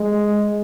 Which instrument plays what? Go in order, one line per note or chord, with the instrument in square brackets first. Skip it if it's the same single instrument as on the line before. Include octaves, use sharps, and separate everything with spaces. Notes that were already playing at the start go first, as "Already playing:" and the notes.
Already playing: [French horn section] G#3